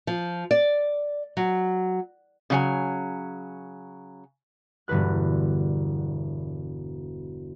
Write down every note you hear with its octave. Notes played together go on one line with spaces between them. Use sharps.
F3
D5
F#3
C#3 F#3 G#5
E1 G2 D3 B4 F#6